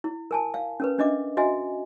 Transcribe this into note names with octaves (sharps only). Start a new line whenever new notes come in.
E4
A#4 G#5 A5
F5
C#4 A#4 B4
C#4 D4 D#5 E5 D6
F#4 D#5 E5 G#5